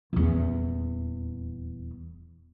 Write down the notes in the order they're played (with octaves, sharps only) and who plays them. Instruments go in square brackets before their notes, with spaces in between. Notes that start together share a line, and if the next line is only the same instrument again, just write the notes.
[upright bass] D#1 E2